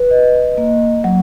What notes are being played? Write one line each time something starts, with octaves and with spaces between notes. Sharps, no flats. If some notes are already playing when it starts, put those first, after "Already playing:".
Already playing: B4
D#5
A#3
F#3